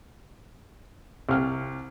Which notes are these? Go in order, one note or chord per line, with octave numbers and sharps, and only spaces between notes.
C2 F6